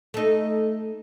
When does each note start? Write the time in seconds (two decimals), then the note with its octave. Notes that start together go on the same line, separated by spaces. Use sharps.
0.14 A3 D#4